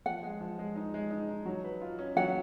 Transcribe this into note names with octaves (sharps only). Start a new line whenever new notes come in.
F3 F#5
G#3
F3
G#3
D#4
G#3
D#4
D#4
F#3
B4
F4
C#4
F#3 F#5